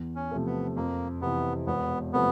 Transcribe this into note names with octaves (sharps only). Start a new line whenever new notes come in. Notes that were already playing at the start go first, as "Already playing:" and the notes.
Already playing: E2
C#4
C3 F3 A3
B3
F2 A#3
C3 E3 B3
E1 B3
C3 F3 A3 B3